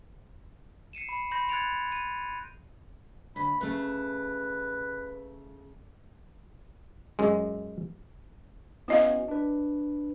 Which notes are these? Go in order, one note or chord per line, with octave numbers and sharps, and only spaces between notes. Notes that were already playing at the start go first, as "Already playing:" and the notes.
C7 C#7 D#7 E7
B5 C7
B5 C6 G6 A#6
F#6 G#6 A6 C#7 D7 F7
D#7
D2 B5
C#3 A3 B4
F#2 G#3
B3 C#4 E4 F#4 D#5 F5
D4 B4